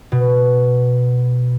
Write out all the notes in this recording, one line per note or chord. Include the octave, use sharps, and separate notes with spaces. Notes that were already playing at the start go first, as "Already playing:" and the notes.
B2